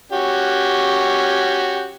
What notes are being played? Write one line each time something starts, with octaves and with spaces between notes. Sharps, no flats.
C#4 F#4 G4